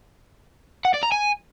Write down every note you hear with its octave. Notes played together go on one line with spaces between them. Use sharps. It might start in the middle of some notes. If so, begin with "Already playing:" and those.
F#5
D5
A#5
G#5